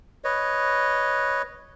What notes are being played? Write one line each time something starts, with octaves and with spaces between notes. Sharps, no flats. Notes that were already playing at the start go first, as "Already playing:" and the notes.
B4 C#5 D#5